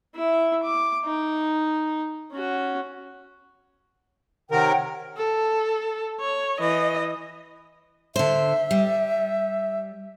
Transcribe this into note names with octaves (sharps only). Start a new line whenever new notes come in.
E4 E5
D6
D#4
C#4 F#4
C3 D#3 A#4 C#5 F#5 G5
A4
C#5
E3 D#5
D3 C5 E5
G3